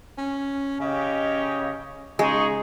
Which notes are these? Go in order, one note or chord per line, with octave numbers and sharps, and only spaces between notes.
C#4
C#3 G4 C#5 D#5
C#3 G#3 D#4 G#4 C#6